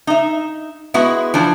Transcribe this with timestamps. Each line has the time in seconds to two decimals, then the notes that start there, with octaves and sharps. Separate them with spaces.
0.07 D#4 E5
0.94 G#3 B3 E4 F#4
1.34 E3 F3 D4